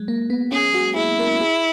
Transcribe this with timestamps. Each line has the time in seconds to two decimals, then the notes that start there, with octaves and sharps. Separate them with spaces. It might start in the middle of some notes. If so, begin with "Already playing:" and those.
Already playing: F#3 G#3
0.08 A#3
0.30 B3
0.52 C#4 G#4
0.74 F#4
0.96 E4 G#4
1.19 A#4
1.41 G#4